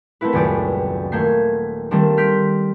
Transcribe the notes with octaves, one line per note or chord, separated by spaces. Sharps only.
A3 B3 C4 E4 B4
D#1 C#2 F#2 D5 G5
D#1 A3 A#3 G6 G#6 C7
D#3 G3 A3 A#3 C4 D4
C6 F6 G6 B6 D7